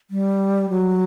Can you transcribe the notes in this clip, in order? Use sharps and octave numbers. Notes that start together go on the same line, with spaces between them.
G3
F#3